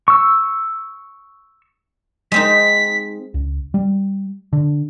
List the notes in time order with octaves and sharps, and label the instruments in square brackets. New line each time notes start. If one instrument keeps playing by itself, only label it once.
[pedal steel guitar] C#6 E6
[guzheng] G#3 C4 D#4 [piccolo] B6
[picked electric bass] C#2
G3
D3